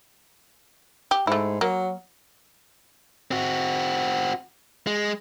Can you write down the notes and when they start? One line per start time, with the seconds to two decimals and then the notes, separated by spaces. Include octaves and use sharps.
1.11 G4
1.27 G#2 A3 E4
1.61 F#3 A#3
3.31 C4 F#4
4.87 G#3